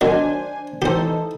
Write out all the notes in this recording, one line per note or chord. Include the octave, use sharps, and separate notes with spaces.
D#3 F#3 D4 C5 G#5
E3 D#4 G4 A4 C5